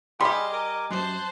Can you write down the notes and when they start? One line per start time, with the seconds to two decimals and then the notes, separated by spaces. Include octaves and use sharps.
0.21 G3 G4 G#4 D#5 B5 C6 E6 F6
0.52 A#4 G#5 D6
0.91 F#2 C5 A5 C6 F#6